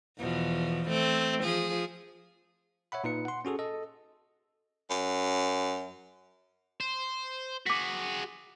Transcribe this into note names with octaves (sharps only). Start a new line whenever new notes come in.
E2 B2 F3
A3 C4
F3 G#4
C#5 E5 F#5 B5
A#2 D#4 B4 C#7
F#5 C6
C#4 F#4 G#4 A4
A4 D#5
F#2
C5
F#4 G#4 D6 B6